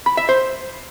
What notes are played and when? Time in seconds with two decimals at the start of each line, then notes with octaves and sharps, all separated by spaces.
0.06 B5
0.17 E5
0.29 C5